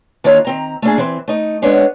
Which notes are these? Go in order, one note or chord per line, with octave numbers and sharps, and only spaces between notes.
D#3 A#3 D4 E4 F4 C#5
D#3 C4 A#5
A3 A#3 D4 G#4
E3 C4
A3 D#4
G#3 B3 C#4 D4 C#5